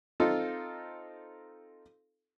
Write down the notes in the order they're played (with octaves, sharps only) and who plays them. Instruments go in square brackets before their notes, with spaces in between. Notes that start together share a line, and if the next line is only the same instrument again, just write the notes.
[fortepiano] C4 D#4 F4 A4